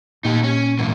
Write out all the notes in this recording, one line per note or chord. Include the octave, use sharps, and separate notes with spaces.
A#2 D#4 G4
C#4
E2 G#2 A#3